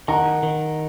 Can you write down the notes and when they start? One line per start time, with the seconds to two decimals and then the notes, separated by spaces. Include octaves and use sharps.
0.08 D#3 F#5 A#5
0.43 D#3